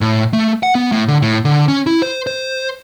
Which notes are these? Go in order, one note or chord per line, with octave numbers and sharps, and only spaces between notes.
A2
A3
F#5
B3
A2
D3
A2
D3
C#4
E4
C5
C5